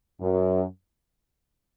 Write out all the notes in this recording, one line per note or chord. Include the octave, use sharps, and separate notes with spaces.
F#2